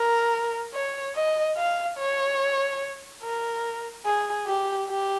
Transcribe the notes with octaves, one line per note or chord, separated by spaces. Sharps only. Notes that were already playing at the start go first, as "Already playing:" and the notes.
Already playing: A#4
C#5
D#5
F5
C#5
A#4
G#4
G4
G4